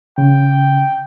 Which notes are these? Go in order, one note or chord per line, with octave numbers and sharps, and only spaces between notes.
C#3 G5